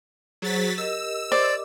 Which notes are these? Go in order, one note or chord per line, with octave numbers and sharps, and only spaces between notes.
F#3 G#4 C5 A6 B6
G4 A#4 D#5 E6
C5 D5